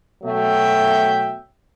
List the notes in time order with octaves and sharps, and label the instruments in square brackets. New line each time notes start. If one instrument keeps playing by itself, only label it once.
[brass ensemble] B2 F#3 A3 E5 G5